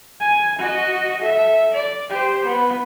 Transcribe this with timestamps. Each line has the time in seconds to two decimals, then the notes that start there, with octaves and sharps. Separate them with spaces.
0.20 G#5
0.58 F#4 D#5
1.21 A4 E5
1.74 D5
2.10 G4 C5
2.45 B3